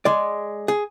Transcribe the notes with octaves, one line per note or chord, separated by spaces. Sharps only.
G#3 D5
G#4